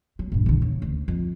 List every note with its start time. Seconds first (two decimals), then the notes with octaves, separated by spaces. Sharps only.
0.19 F#3
0.32 A#1 G2
0.46 E2 D3
0.62 C#3
0.82 D2
1.08 F2